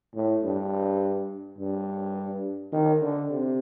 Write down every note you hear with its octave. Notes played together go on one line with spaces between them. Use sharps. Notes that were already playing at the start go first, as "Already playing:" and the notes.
A2
G2
G2
D#3
D3
C3